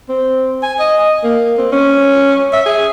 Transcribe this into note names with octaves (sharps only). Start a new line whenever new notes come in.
C4
G#5
D#5
A#3
C4
C#4
E5
G#4